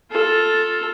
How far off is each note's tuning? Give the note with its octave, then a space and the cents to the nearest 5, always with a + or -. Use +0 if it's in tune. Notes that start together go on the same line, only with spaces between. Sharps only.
F4 +10 A4 +0